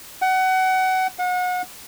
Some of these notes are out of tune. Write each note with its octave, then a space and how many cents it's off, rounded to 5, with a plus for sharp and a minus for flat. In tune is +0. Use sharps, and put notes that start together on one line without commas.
F#5 +25
F#5 -35